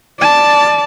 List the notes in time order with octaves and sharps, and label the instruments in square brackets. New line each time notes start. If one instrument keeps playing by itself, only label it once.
[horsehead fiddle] D5 A5